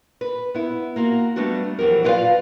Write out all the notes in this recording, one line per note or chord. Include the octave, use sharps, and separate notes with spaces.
B4
B3 E4
A#3 F4 F#4
G3 A3 B3 D4 F#4
F2 E3 F#3 G4 A#4
E4 F4 B4 C5 D5 F5